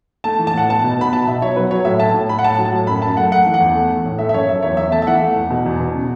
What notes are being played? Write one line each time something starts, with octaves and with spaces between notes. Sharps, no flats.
A3 A5
E3
A5
A2 F#5
B3 A5
B2
B3 B5
B2 A5
B2 E5
F#3 C#5
F#3 B4
F#3 C#5
A2 E5
A3 A5
A2
A2 B5
F#5
A2 A5
F#3
A5
A2
F#2 B5
F#2 A5
A3 F#5
A3 F#5
E3
F#5
E2
A3
E3
A2
A3 E5
E5
F#2 C#5
F#2 E5
E2 C#5
E2 E5
A3 A5
E5
E3 F#5
A3
E2
B2
E2
B2
C#3